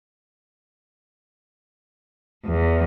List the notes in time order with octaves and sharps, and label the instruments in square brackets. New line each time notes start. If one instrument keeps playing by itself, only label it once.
[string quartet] E2